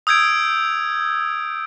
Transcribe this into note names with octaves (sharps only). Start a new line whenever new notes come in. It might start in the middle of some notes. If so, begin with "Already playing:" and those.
D#6 E6 G6 G#6 D7